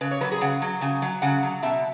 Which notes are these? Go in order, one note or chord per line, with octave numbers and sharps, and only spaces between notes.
C#3 B4
C#5
F#3 B4
G#4
C#3 F#5
F#3
C#3 G#5
F#3
C#3 F#5
F#3
B2 E5